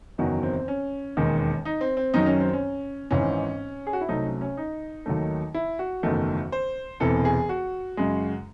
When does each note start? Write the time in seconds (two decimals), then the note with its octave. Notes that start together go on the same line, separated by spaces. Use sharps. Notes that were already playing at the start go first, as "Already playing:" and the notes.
0.18 F#1 E2 D#3 F#3 F#4
0.43 C4
0.68 C#4
1.17 E1 D#2 D#3 G#3
1.65 D#4
1.81 C4
1.97 C4
2.14 F#2 D#3 F#3 D#4
2.26 C#4
2.40 C4
2.53 C#4
3.11 G#1 G#2 E3 C#4
3.87 G#4
3.93 F#4
4.01 E4
4.09 C2 C3 F#3 A3 D#4
4.25 C#4
4.41 C#4
4.57 D#4
5.06 D#2 D#3 F#3 A3
5.54 E4
5.79 F#4
6.03 F#1 E2 D#3 A3
6.52 C5
7.00 E1 E2 C3 E3 A4
7.25 G#4
7.49 F#4
7.97 F#2 C#3 G#3